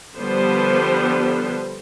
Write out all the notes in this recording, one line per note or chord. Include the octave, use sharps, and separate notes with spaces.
D3 F3 G3 B3 B4 C5